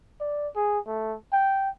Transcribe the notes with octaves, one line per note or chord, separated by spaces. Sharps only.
D5
G#4
A3
G5